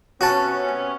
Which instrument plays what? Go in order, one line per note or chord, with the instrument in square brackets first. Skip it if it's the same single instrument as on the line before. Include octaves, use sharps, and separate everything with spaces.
[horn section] C3 B3 C#4 [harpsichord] F#4 F#5 A5